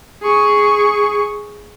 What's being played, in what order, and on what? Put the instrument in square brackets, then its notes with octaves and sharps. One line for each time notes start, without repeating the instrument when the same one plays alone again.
[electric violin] G#4 C#6